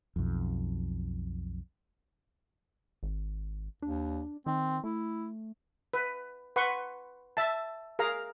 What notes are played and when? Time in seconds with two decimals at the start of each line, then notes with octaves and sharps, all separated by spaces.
0.16 B1 F2
3.03 G#1
3.82 D#2 D4
4.46 D#3 C4
4.84 A3 E4
5.94 B4
6.56 B4 F#5 C6 C#6
7.37 E5 A5
7.99 G#4 A#4 F5 A#5